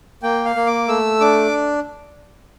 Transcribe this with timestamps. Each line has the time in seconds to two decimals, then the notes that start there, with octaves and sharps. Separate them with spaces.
0.23 A#3 G5
0.45 F5
0.56 A#3
0.66 D6
0.88 A3 E6
1.20 D4 D6